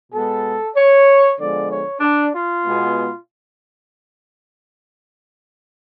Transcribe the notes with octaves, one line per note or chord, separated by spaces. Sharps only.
B2 G#3 B3 A4
C#5
D3 F3 G#3 B3 D5
C#5
D4
F4
B2 G#3 B3